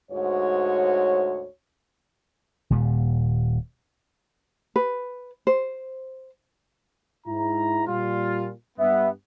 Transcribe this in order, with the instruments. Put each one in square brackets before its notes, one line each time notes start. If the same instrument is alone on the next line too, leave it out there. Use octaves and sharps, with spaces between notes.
[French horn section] D2 G#2 F#4 C#5
[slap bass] D#1 A#2 G3
[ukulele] B4
C5
[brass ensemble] G#2 E4 A#5
A#2 G3 F4
[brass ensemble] G2 B3 [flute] E5